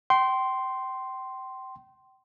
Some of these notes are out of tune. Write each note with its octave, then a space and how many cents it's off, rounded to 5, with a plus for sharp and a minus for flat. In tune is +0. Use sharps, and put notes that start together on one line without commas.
G5 -30 C6 +0